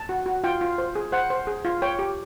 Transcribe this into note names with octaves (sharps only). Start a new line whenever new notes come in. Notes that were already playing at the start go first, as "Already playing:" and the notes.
Already playing: A5
F#4
F#4
F4 G5
F4
C5
G#4
C5 F#5
C5
G#4
F4
C#5 G5
G4